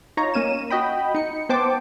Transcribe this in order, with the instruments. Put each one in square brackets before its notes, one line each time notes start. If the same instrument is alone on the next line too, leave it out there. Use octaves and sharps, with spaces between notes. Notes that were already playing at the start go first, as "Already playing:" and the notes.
[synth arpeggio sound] D#4 F4 C#5 A#5
A#3 C#4 D#7 E7
F#4 D#5 G5 B5
D#4 C#7
B3 C5 G5 A5 D6